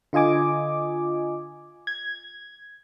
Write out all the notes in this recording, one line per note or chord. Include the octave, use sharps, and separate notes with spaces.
D3 F4 D#5 G#5 D6
G#6